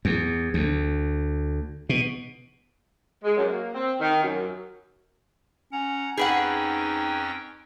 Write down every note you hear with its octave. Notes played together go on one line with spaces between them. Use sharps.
E2
D2
B2
G#3
F#2
A#3
C4
D#3
F#2
C#4 F#5 A#5
F2 C#4 D#4 G#4 B4 F#5 G5